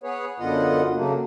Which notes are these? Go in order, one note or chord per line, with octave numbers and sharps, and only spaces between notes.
B3 G#4 B4 C#5
F#2 D3 B3 F4 D#5 F#5
C#3 F#3 A3 A#3